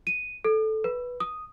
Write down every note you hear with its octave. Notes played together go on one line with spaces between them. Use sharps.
D#7
A4
B4
D#6